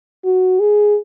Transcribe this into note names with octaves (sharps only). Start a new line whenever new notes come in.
F#4
G#4